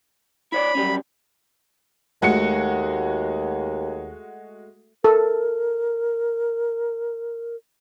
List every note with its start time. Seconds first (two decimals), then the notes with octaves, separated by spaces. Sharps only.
0.52 E4 C#5 D5 B5
0.75 F#3 G3 C#4
2.22 D#2 G#3 A3 F#4 C#7
5.04 A4 A#4